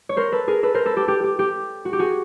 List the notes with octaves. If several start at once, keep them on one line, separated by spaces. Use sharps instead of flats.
C#5
A#4 C5
A4 B4
G#4 A#4
A4 B4
A#4 C5
A4 B4
G4 A4
G4
G4
G4
F#4
G4
F#4 G#4